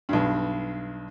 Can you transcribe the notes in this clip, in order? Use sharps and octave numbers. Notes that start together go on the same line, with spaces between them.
B1 G2